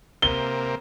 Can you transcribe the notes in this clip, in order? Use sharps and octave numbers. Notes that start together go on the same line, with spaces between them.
C3 A#3 G7